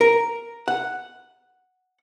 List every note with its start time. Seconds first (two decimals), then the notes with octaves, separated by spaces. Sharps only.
0.01 A#4
0.68 F#5